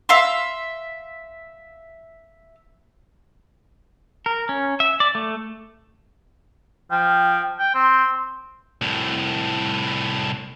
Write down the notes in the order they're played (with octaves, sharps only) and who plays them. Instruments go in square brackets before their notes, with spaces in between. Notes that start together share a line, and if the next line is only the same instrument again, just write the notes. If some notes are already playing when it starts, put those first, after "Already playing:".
[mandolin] E5 F5 C6
[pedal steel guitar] A#4
C#4
E5
D5
A3
[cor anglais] F3 [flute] G5
[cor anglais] G5
[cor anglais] C4 [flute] C6
[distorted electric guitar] C2 A2